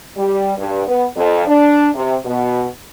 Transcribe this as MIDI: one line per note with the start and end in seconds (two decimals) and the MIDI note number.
0.17 0.53 55
0.58 0.83 43
0.87 1.05 59
1.16 1.43 41
1.47 1.89 62
1.94 2.17 48
2.25 2.66 47